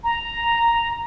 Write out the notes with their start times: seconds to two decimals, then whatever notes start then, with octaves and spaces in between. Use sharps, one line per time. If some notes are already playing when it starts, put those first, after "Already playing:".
0.04 A#5